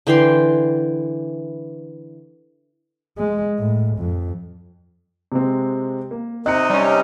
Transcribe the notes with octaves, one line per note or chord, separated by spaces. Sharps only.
D3 E3 G5 C6
G#3
A2
F2
C3 G#3 C4
A#3
C3 C4 D#4 D#5 F#6 C#7
G3 C#4